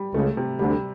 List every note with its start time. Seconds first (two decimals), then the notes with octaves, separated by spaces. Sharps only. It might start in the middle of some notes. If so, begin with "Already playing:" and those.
Already playing: G3
0.14 C#2 C#3 A3
0.37 C3
0.59 D2 D3 G3